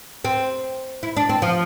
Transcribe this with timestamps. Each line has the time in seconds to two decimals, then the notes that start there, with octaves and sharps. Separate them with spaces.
0.25 C4
1.03 E4
1.17 D4
1.29 C4
1.42 F3